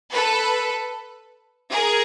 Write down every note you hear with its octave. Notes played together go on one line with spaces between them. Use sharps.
A4 B4
G#4 A#4